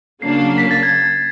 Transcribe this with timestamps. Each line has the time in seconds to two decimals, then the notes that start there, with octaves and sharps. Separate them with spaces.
0.22 C#3 F#3 A#3 D4 C7
0.58 B6
0.71 A6
0.83 G#6